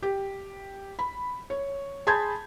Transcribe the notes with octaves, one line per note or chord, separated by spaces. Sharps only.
G4
B5
C#5
G#4 A5 B5 C6 G6 G#6